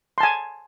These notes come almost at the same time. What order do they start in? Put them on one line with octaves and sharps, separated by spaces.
C6 A5 G#5